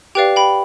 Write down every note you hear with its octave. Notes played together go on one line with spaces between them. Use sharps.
G4 B4 D5 F5 G5
G5 B5